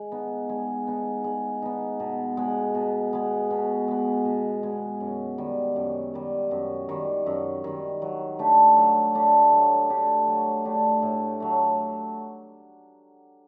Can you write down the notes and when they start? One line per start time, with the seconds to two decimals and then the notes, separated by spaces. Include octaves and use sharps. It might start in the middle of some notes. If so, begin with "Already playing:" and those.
Already playing: G#3
0.12 B3 D#4
0.49 G#3
0.87 B3 D#4
1.24 G#3
1.62 B3 D#4
2.00 B2
2.37 G#3 B3
2.75 B2
3.13 G#3 B3
3.51 B2
3.88 G#3 B3
4.25 B2
4.63 G#3 B3
5.00 F#2
5.38 D#3 G3
5.76 F#2
6.14 D#3 G3
6.51 F#2
6.89 D#3 G3
7.26 F#2
7.64 D#3 G3
8.02 F#3
8.39 A3 D4 G4
8.77 F#3
9.15 A3 D4 G4
9.52 F#3
9.90 A3 D4 G4
10.28 F#3
10.65 A3 D4 G4
11.02 A2
11.40 F#3 A3